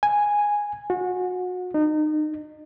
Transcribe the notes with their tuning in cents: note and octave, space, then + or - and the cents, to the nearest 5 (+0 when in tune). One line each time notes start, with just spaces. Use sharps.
G#5 -5
F#4 -30
D#4 -30